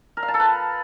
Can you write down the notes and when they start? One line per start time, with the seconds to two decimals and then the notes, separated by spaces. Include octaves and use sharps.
0.17 A#4
0.23 F5
0.28 A5
0.34 A4
0.40 B4